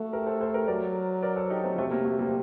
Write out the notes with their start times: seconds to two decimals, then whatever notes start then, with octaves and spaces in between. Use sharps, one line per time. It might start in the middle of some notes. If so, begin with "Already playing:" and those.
Already playing: A3 F#4
0.13 G4 A#4
0.26 A4 C5
0.41 A4 C5
0.54 G4 A#4
0.68 F#3 A#4 D5
1.23 A#4 D5
1.36 A4 C5
1.50 D#4 G4
1.64 A3 C4
1.77 C3 A3 C4
1.91 G3 A#3
2.05 F#3 A3
2.19 G3 A#3
2.27 C4